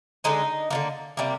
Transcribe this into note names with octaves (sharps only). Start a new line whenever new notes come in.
D3 G#3 C4 D#4
D3 G3 A#3
C3 G3 A#3